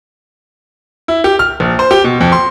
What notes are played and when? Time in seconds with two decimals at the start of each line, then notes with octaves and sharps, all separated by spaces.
1.08 E4
1.24 G4
1.39 F6
1.60 A#1
1.79 C5
1.91 G4
2.04 B2
2.21 F2
2.32 C6